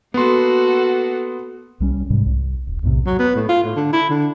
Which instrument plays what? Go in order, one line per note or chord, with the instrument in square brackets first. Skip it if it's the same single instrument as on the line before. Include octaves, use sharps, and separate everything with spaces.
[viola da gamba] A#3 F#4 A4 [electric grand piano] B3 C6
[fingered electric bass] C2 G3 C#4
G#2 C3 G3 G#3
C2
D#1
B1 E2 A2 C3
[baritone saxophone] F#3
B3
A2
F4
A2
D3
E4
D3